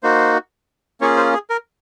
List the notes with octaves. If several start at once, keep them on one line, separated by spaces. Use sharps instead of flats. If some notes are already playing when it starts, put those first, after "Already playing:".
A#3 D#4 F#4 C5
A#3 C#4 F4 G#4 C#5
C5
G#4
A#4